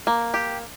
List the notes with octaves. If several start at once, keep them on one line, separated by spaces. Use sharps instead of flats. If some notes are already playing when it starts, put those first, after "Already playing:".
A#3
G4